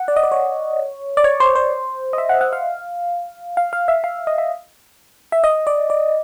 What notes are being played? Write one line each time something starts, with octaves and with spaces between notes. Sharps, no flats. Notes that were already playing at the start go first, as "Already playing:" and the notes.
Already playing: F#5
D5
D#5
D5
C#5
D5
C#5
C5
C5
D#5
E5
F#5
F#5
F5
F5
F5
E5
F5
D#5
E5
E5
D#5
D5
D5